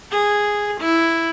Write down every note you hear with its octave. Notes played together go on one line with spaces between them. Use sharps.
G#4
E4